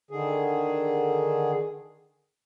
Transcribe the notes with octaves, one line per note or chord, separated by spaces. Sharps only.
D3 D#3 G#4